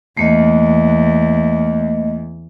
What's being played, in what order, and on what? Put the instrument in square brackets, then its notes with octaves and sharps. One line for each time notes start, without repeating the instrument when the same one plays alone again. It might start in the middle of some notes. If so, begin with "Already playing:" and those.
[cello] E2 [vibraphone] A3 A#3 D#5